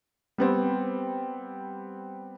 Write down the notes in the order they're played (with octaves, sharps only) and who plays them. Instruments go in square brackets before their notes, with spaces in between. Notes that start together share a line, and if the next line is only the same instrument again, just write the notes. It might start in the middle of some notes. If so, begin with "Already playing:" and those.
[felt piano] G3 B3 C4